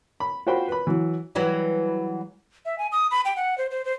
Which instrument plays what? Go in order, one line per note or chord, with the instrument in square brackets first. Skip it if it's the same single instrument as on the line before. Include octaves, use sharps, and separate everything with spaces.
[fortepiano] B5
F4 F#4 C5 G5 B5
B4 B5
E3 F#3
[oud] E3 F#3 G3
[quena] E5
G#5
D#6
B5
G5
F#5
C5
C5
C5